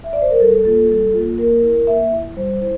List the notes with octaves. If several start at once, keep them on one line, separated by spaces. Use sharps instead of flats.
E5
D5
C5
A#4
G3 A4
A#3 F4 A4
G3 A4
A#3 F4
A#3 A#4
E4
A#3 E5
E4
G3 C5
E4 C5